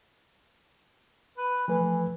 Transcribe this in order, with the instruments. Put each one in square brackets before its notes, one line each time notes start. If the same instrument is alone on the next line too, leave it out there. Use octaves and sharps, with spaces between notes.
[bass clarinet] B4
[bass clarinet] E3 [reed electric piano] F3 A3 B4